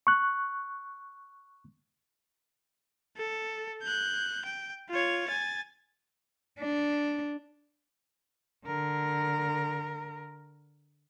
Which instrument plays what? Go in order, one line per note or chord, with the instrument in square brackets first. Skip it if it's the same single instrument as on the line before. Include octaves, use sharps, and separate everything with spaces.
[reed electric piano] C#6 F#6
[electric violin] A4
F#6 G6
G5
F4 C#5
G#5 A6
[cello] D4
D3 A#4